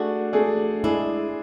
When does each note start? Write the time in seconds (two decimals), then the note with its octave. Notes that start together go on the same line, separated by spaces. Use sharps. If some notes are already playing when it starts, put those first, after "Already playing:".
Already playing: A3 D4 F#4 G#4
0.33 A3 D4 G#4
0.84 G#3 D4 E4 G#4